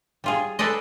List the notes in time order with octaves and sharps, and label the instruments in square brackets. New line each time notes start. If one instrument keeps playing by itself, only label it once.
[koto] G3 F4 G#4
G#4 A4 B4 C5 D5 D#5